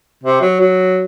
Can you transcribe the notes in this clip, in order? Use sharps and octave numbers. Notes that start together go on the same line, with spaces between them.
C3
F#3
F#3